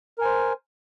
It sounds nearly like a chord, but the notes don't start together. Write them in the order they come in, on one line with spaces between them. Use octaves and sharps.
A#4 G#5 C5